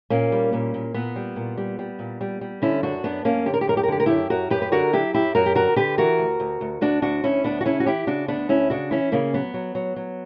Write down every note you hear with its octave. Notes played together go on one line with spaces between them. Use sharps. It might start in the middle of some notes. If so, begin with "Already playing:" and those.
A#2 A#3 C#4
G3
A#2
A#2
A#2 B3
G3
A#2
G3
G3
A#2
G3
G3
D3 C#4 E4
F#2 D4 F#4
F#2 B3 D4
F#2 A#3 C#4
D3 G4
A#4
G4
F#2 A#4
G4
A#4
D3 G4
A#4
F#2 E4 G4
F#2 F#4 A#4
F#2 G4 B4
B4
D3 F#4 A#4
F#3 E4 G4
F#2 E4 G4
F#2 F#4 A#4
G4
D3 F#4 A#4
D3 G4 B4
E3 F#4 A#4
D2
D2
D2
D2 D4 F#4
D2 D4 F#4
D2 C#4 E4
D2 B3 D4
F#4
C#3 C#4 E4
F#4
E3 E4 G4
C#3 D4 F#4
D2 B3 D4
D2 C#4 E4
C#3 D4 F#4
E3 C#4 E4
C#3 A#3 C#4
F#3 B3
F#3
F#3
F#3